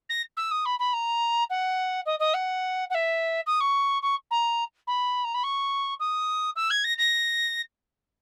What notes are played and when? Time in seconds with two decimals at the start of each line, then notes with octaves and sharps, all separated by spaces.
0.09 A#6
0.37 E6
0.51 D#6
0.65 B5
0.79 B5
0.93 A#5
1.50 F#5
2.06 D#5
2.19 D#5
2.34 F#5
2.90 F#5
2.94 E5
3.46 D#6
3.60 C#6
4.02 C#6
4.31 A#5
4.87 B5
5.24 A#5
5.34 B5
5.43 C#6
6.00 D#6
6.56 E6
6.70 G#6
6.84 A#6
6.98 A#6